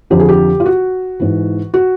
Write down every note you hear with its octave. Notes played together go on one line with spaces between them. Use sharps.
F2 D3 F3 G4
G#4
G4
F4
F#4
G#2 E3
F#4